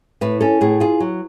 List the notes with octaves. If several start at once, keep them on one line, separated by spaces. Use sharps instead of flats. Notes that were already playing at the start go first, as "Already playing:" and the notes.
A2 B4
C#4 A4
A2 G#4
F4 G#4
F#3